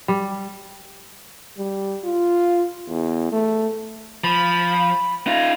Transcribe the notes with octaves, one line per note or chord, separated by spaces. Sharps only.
G3
G3
F4
E2
A3
F3 B5
D#4 F4